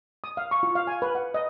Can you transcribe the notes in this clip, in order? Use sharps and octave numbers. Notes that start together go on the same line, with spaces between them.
D#6
F5
C#6
F4
F5
G#5
B4
F#5
D#5